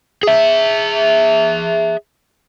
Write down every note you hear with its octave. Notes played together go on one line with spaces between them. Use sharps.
G#4 E5